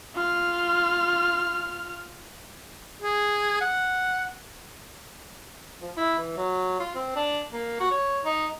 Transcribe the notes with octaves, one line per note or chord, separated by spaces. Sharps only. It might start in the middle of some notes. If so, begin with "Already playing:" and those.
F4 F6
G#4
F#5
F3
E4
E3
F#3
F4
C4
D4
A#3
F#4
C#5
D#4